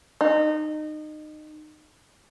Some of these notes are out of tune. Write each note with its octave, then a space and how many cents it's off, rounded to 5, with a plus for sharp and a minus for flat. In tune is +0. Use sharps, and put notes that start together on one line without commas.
D#4 -25